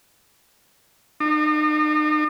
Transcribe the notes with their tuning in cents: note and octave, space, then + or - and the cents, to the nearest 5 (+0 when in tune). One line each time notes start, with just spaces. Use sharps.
D#4 -40